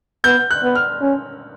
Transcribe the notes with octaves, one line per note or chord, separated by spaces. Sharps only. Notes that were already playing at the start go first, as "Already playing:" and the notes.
B3 G6
F#6
B3
F6
C#4